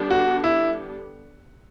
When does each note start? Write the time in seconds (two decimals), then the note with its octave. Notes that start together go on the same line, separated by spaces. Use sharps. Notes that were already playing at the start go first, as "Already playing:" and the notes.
Already playing: D3 G3 B3 D4 G4
0.10 F#4
0.44 E4